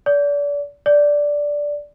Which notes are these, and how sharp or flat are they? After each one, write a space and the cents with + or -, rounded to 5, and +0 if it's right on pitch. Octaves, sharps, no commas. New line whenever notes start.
D5 -30
D5 -5